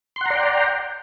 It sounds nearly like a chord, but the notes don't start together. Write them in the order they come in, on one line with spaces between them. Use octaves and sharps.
C6 F#5 A#5 D5 G5